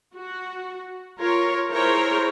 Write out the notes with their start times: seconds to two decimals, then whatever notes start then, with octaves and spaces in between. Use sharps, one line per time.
0.14 F#4
1.18 F4 A#4 C#5
1.70 E4 G#4 A#4 C5 C#5